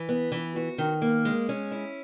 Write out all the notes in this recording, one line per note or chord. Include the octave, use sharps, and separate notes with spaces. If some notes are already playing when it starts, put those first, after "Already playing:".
Already playing: E3
B3
E3
F#4
D#3
A#3
G#3
C#4
E4